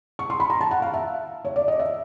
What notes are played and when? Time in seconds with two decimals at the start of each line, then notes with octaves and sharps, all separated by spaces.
0.19 C#6
0.30 C6
0.40 B5
0.50 A#5
0.61 A5
0.71 F#5
0.82 F5
0.94 E5
1.45 C#5
1.56 D5
1.68 D#5
1.80 E5